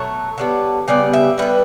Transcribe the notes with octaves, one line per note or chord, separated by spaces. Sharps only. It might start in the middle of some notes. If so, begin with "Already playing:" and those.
Already playing: B2 F#3 A3 C#5
D3 G3 B3
C#3 G3 B3 D5
E5
D3 G3 B3 B4